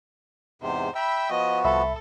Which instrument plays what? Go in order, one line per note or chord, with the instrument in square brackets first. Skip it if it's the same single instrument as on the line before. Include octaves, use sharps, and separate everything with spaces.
[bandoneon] E2 G#2 C3 [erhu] C5
[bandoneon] E5 G5 E6 [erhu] B5
[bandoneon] F3 B3 F#4 [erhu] D#5
[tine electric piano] C2 E5 B5 [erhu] A4